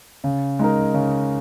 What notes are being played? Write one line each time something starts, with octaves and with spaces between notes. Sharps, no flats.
C#3
G#3 D#4 A#4
C#3